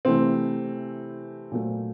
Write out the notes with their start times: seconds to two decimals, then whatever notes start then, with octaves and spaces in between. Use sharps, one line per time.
0.05 C3 E3 A3 C4
1.52 A#2 F#3 A3